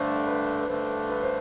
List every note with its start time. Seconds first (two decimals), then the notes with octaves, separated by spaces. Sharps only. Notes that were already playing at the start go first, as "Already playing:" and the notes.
Already playing: G2 D3 A3 D4 C5
0.26 B4
0.59 B4
0.67 G2 D3 A3 D4 C5
1.09 B4
1.23 C5